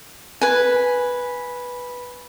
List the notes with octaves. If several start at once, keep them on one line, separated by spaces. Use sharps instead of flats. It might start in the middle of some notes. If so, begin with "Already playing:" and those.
B4 G#5